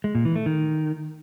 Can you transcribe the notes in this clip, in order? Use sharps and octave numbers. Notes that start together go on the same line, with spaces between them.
G#3
A#2
E3
A3
D#3